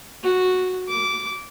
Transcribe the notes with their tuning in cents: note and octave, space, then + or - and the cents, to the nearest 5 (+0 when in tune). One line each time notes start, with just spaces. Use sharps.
F#4 -5
D6 -15